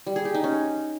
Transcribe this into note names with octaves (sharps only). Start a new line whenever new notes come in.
G3
G#4
G4
D#4
C#4